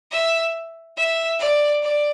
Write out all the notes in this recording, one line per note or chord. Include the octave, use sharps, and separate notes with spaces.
E5
E5
D5
D5